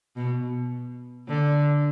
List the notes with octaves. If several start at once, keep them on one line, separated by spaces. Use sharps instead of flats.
B2
D3